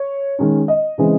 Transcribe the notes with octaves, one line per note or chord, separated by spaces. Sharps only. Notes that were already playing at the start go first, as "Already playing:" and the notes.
Already playing: C#5
D#3 G#3 C#4
D#5
C#3 E3 G#3 C4